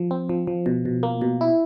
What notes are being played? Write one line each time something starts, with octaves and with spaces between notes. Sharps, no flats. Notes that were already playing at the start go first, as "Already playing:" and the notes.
Already playing: F3
C4
F3
F3
B2
B2
A#3
B2
E4